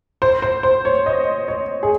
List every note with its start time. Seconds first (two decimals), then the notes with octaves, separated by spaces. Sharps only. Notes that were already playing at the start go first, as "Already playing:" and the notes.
0.22 C5
0.42 C5
0.63 C5
0.85 C#5
1.06 D#5
1.48 C#5
1.83 G#4